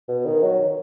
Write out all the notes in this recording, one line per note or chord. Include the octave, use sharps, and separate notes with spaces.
B2
D#3
F#3